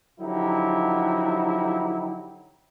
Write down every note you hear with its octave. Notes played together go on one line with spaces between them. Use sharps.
D3 F3 F#3 D#4 E4 G4